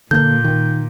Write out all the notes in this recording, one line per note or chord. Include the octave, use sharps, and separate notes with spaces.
A#2 D3 A#3 G6
D#3